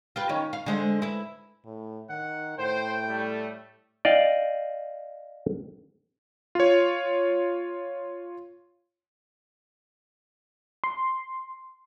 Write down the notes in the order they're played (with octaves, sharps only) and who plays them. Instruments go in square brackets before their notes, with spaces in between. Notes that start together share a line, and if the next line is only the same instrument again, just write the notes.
[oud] F4 G4 B4
D#3 C#4
F5
D3 G#3 C5
E4 B4
[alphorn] A2
[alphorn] D#3 [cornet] F#5
[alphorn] A2 [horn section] C5 [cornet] G5
[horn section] G3 A3
[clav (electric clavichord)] D5 D#5 F5 G5
[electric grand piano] F4 C#5
[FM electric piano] C6